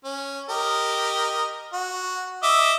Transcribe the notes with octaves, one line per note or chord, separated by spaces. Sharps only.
C#4
G4 A#4 D#5
F#4
D#5 E5 D6